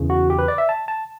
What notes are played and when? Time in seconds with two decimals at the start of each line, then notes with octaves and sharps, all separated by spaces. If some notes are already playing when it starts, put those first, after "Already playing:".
Already playing: E2 C#3 E3
0.10 F#4
0.30 G4
0.39 B4
0.48 D5
0.58 E5
0.69 A5
0.88 A5